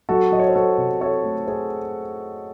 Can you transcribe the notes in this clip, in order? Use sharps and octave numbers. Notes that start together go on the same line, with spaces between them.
F#3 F#4 A4
F#3 D#5
C#5
C5
F#3 F#4 A4
C3
C4 A4 C#5
A3
C4 G#4 C5